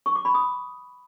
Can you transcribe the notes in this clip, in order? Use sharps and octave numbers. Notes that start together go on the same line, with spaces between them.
C#6
D6
B5
D#6